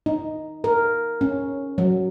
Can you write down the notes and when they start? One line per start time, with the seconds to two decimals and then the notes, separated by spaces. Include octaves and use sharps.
0.06 D#4
0.64 A#4
1.21 C#4
1.78 F#3